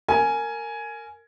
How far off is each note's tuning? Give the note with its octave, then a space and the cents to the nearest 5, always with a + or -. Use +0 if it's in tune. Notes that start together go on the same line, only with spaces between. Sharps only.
A#4 -20 G#5 +10